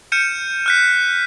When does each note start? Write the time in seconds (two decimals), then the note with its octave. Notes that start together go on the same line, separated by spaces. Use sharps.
0.12 F6 G6 C#7 D#7 E7
0.66 F6 F#6 B6